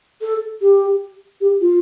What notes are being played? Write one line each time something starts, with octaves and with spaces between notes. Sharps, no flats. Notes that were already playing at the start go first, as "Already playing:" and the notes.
A4
G4
G4
F4